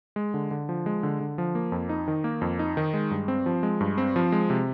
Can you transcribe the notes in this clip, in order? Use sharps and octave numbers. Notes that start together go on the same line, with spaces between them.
G#3
D3
D3
F3
G#3
D3
D3
F3
A#3
F2
D#4
D#3
A#3
F2
D#4
D#3
G#3
G2
C4
F3
G#3
G2
C4
F3
G#3
C3